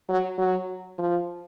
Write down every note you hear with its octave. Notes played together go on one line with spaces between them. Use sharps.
F#3
F#3
F3